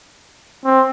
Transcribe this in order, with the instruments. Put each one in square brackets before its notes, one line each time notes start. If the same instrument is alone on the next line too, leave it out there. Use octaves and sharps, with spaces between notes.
[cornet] C4